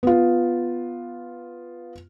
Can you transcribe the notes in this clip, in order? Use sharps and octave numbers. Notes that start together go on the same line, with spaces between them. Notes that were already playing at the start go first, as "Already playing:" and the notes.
B3 F4